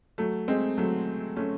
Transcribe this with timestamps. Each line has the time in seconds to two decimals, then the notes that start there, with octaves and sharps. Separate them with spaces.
0.18 F#3 A3
0.48 G#3 C4
0.78 F#3 A3
1.36 A3 C#4